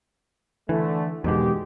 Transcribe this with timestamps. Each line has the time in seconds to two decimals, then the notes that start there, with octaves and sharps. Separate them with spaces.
0.69 D3 E3 A3
1.24 E2 G#2 B2 D#3 G#3 G4